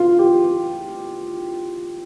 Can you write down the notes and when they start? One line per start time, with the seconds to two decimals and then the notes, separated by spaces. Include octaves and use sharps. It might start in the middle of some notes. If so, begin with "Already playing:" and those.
Already playing: F4
0.19 G4